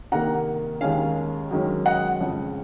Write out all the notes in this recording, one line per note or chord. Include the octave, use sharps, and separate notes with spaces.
C3 D#3 A#3 F#5 A#5
D#2 D#3 G#3 C#4 F5 G#5
F#2 D#3 G#3 C#4
D#5 F#5
F2 C#3 G#3